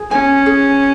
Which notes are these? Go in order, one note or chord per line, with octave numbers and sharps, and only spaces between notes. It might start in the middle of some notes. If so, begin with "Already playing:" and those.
Already playing: G#4
C#4 G#5
G#4